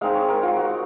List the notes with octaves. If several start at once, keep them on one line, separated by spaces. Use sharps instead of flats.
G#3 C4 D#4 F5
C#5
A#4
F4
F#4
D#5